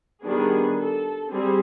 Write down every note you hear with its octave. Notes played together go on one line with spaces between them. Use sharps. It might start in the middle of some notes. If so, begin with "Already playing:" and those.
D#3 G3 B3 D4 G#4
A4
G3 C4 G#4